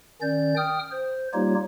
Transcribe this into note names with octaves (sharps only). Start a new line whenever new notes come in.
D#3 C#4 D5 G6
G5 D#6 F6
C5
G3 A#3 D#4 F4 G4 C#5